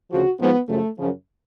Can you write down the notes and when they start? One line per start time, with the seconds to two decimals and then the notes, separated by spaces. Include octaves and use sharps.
0.11 D2 C#3 F3 F#4
0.40 G#2 F3 B3
0.69 F#2 C#3 F3 A3
0.98 F#2 C#3 F3